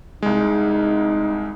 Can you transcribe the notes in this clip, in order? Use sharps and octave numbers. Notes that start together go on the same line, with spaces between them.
C2 G#3 D#4